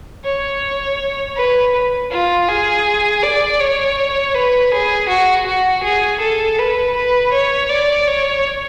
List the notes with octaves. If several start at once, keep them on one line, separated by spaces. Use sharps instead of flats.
C#5
B4
F4
G#4
D5
C#5
B4
G#4
F#4
F#4
G#4
A4
B4
B4
C#5
D5
C#5